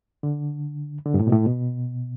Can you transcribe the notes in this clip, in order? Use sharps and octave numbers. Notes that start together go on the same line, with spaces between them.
D3
D3
G2
A2
B2
A2
B2